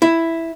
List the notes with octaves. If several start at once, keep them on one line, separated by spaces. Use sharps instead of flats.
E4